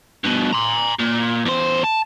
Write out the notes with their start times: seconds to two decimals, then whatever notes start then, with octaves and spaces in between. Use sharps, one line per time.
0.24 G2 B2
0.53 A#5 C6
1.00 A#2
1.46 E2 C5
1.84 A5